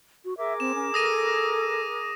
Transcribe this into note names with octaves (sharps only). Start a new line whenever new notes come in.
F#4
G#4 A#4 E5 D6
C4 E7
C#4
A4 D#6 A#6 D#7